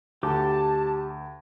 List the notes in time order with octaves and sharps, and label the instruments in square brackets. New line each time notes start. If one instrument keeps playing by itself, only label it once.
[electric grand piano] D2 [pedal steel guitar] G4 D6 [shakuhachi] A5